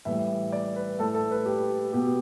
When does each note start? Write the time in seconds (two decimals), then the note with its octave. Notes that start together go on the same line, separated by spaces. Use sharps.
0.05 A2 E3 G3 E5
0.52 D5
0.76 B4
0.99 A2 A3 A4
1.14 A4
1.31 B4
1.46 G4
1.93 B2 B3 G4